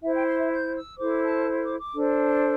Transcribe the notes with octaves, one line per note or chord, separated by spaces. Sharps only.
E4 C5 E5
G5
C6
E5
G6
E6
E4 A4 C5 D6
A5
D6
D6
D4 A4 C5
A5